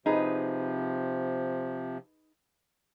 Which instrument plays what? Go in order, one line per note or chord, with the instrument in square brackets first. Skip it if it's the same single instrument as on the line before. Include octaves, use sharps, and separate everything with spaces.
[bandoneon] C3 F3 [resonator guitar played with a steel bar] D#4 G#4 B4